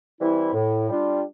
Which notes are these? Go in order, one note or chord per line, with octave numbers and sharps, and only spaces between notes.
E3 G3 C4 E4
A2
G3 D4 F4